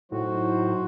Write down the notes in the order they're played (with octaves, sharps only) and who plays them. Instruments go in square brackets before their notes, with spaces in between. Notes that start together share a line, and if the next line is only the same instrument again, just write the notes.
[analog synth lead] A2 [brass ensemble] F#3 D#4 C5 [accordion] F#4